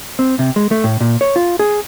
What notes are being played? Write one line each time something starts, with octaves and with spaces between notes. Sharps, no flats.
C4
C3
G#3
A3
A2
A#2
C#5
F4
G#4